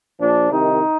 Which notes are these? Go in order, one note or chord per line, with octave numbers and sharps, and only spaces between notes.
A#1 A#2 F3 D4
C2 C3 D#3 D#4